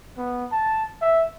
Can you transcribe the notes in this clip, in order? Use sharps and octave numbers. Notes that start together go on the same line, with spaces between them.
B3
A5
E5